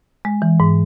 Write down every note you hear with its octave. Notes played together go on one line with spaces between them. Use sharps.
G#3
E3
G#2